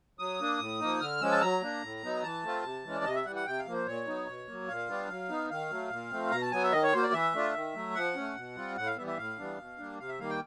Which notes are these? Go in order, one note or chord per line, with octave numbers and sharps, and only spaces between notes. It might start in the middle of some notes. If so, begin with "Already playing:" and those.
F#3 D#6
A#3 D4
A2
F3 A#3 D#4
D3 F6
F3 G#3 C#4 E6
A5
F#3 A#5
A#3 D4
A2
F#3 B3 D#4
E3 A5
A3 C4 F4
C3
E3 G#3 C#4
D5
C3 D#5
E5
E3 G3 F#5
F#5
C3 G5
F5
F3 A#3
C5
A#2 C#5
F#3 B3 D#4
B2
F#3 A#3
A#2 F5
G3 B3 D4 F4
F#3
B3 D#4
D#3 F5
F#3 A3
A#2
F3 A3 C4
B2 A#5
A5
F#3 B3 G#5
E5
D#3 D#5
C#5
F#3 A#3 C5
D5
E3 E5
A3 D4 F4
D#3
F#3 A3
F3 F#5
A3 C#4
B2
G3 C4 F4
A2 F#5
F5
E3 G3 B3 E5
E5
A2 F5
E3 G3 B3 D4
B2
G3 A#3 D4
C3 F5
E5
D#3 G3 A#3 F5
G5